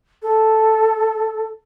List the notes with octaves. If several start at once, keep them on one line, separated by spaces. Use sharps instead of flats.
A4